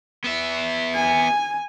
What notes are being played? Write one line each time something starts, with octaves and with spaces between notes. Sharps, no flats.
B3 E5
G#5